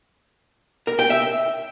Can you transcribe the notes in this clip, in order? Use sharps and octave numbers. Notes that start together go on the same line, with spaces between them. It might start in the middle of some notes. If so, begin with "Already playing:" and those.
A#4
G5
E5